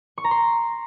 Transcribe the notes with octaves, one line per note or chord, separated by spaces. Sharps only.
C#6
A#5
C6